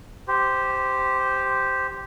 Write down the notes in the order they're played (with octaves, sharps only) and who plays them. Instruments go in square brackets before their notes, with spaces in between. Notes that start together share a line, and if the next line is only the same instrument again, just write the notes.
[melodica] G4 C5